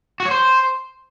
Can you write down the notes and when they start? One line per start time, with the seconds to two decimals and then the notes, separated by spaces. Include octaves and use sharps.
0.20 F#4
0.25 C#5
0.31 C5